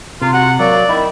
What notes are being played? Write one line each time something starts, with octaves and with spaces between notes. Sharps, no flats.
C3 F4
F#4 F#5
F#3 A#3 D5
D#3 E4